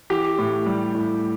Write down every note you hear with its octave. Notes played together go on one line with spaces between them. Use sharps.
E3 G4
A2
G3
A2